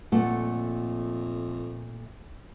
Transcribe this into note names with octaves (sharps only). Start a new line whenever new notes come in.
F2 A#2 A3 F#5